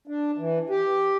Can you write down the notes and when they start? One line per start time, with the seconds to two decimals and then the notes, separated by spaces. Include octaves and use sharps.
0.07 D4
0.38 E3
0.70 G4